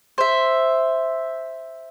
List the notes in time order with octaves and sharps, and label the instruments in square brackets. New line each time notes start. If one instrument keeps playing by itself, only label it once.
[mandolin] C5 E5